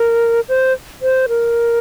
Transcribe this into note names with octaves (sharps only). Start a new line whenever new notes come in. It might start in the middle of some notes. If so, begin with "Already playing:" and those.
Already playing: A#4
C5
C5
A#4